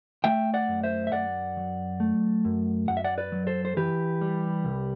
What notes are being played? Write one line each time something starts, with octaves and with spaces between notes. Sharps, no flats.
A3 E5 G5
D5 F#5
F#2
C5 E5
E5
F#2 D5 F#5
F#3
A3
F#2
F#2 F#5
E5
D5 F#5
B4 D5
F#3
A4 C5
C5
E3 G4 B4
G3
C2